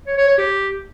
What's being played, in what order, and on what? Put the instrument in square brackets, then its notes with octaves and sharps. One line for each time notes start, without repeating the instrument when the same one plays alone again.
[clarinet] C#5
C#5
C#5
G4